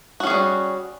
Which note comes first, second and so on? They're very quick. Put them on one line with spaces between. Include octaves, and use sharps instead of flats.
F#4 C#4 G#4 G3